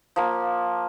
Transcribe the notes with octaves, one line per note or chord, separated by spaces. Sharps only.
F3 A#3